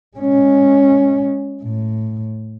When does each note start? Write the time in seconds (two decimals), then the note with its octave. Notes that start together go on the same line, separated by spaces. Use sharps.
0.17 G#3 C#4
1.62 A2